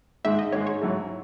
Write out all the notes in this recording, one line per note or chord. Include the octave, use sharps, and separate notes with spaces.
G#2 D#3 G#3 E5
D#5
G#2 D#3 G#3 C#5
C#5
G#2 F#3 A3 E4 A4